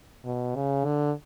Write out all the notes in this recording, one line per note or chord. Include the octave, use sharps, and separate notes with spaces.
B2
C#3
D3